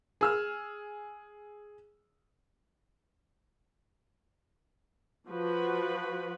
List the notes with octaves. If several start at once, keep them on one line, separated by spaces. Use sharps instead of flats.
G#4 E6 F6
F3 F#4 B4